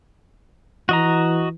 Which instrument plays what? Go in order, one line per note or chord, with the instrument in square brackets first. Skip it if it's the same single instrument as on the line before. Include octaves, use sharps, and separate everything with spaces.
[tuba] E3 [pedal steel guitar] F#4 D#5 A#5